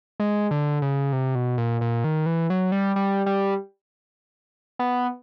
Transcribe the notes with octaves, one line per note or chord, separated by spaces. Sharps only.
G#3
D3
C#3
C3
B2
A#2
A#2
D#3
E3
F#3
G3
G3
G3
B3